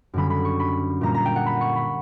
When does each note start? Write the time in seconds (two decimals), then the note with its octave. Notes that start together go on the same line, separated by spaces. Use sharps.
0.14 F#2 D3 G3 C#4 B5
0.30 B5
0.45 C#6
0.59 B5
1.01 A#2 G3 A#3 A#5
1.14 A#5
1.26 G5
1.36 F#5
1.46 B5
1.61 C#6
1.76 B5